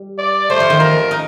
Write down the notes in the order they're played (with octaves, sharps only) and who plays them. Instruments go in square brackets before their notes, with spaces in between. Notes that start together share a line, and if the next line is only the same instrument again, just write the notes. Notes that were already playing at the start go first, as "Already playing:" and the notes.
Already playing: [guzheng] G3
[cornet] D5
[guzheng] A3 [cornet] C5
[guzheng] F3
D#3
[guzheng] F3 [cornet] A#4
[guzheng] D#4